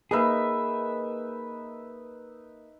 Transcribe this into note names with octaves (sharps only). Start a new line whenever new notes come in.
A#3 D#4 G#4 B4 E5